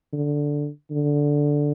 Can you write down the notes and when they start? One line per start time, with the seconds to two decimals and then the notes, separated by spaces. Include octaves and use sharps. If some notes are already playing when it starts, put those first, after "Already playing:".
0.13 D3
0.91 D3